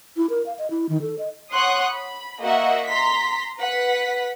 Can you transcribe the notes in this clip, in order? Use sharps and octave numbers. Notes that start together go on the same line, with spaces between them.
E4
A#4
F5
D#5
E4
D#3
A4
D#5
C#5 F#5 C6 C#6 D#6 F#6
B5
A#3 F#4 D#5 E5 F#5
A#5 C6 B6
B4 F#5 B6